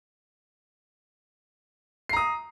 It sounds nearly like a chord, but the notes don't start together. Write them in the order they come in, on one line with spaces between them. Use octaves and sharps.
C7 A#5 D#6